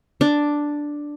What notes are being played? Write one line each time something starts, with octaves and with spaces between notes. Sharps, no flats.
D4